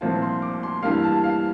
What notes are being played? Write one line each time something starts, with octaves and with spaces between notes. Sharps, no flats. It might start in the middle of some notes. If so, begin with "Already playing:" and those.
C2 A#2 F3 C4 F4 A5
C6
D6
C6
G2 E3 G3 A#3 F5
A5
F5